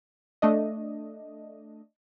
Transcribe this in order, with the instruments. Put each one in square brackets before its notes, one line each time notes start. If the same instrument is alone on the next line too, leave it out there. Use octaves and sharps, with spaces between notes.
[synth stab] A3 D4 D#5